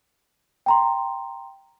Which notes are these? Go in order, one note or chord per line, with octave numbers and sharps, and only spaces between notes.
G5 A#5 C6